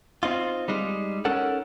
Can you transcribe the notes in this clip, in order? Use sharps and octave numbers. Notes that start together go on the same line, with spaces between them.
C4 D#4 F4
G3 G#3 D#4
C#4 D#4 A4 A#4 F#5